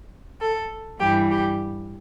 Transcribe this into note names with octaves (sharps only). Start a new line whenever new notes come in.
A4
G2 E3 G3 G4
G4